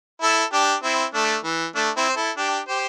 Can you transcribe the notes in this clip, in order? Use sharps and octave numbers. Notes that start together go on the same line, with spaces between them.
E4 A4
D4 G4
C4 E4
A3 D4
E3
A3 D4
C4 E4
C5
E4 A4
D4 G4
G4 C5